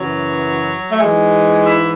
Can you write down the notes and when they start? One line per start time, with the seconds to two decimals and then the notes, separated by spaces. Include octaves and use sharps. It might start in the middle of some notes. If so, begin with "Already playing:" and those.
Already playing: F#2 C#3 E3 F#3
0.90 A3
1.00 G#2 E3 G#3
1.66 E4